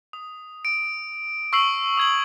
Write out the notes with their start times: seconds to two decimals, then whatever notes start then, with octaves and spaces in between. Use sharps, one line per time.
0.13 D#6
0.65 D7
1.53 C#6 E6 C7 F#7
1.97 D#6 G#6 F#7